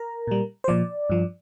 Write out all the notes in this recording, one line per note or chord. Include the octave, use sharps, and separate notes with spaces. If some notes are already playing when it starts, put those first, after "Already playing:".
Already playing: A#4 A#5
A#2 G3
C5
A#2 F3 D5
G2 F3